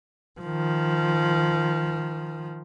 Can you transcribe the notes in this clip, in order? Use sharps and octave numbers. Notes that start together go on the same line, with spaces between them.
D#3 F3